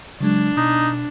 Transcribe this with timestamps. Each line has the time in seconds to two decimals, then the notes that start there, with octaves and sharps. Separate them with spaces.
0.20 C#3 F#3 G#3 D4
0.57 B2 D#4